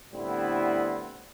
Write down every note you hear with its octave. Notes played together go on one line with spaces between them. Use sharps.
A2 D3 G3 B3 C4 E4